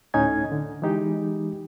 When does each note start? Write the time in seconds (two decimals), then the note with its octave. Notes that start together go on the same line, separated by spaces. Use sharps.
0.14 D2 A2 C#4 D#4 G#5 G#6
0.52 D3
0.82 E3 G#3 D#4 G4